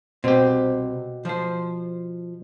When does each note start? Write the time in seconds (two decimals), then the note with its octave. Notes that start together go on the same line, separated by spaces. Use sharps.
0.24 C2 B2 C4 G4
1.25 F3 C5